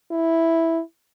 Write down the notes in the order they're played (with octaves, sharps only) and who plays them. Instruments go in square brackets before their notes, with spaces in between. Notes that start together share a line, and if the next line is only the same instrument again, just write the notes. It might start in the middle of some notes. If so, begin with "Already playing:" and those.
[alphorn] E4